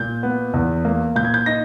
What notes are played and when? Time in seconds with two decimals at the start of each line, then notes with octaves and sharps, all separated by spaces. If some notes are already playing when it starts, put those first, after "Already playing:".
Already playing: A#2 G6
0.23 B3
0.54 E2
0.85 A#3
1.15 A#2 G6
1.25 G#6
1.34 G6
1.46 D#4 A#6